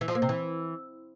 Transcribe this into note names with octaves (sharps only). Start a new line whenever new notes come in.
E3
F3
A#3
C3
E3